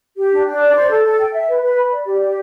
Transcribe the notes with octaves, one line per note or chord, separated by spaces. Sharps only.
G4
D4
D4
D5
C5
A4
A4
G5
E5
B4
B4
B5
D5
G4
G4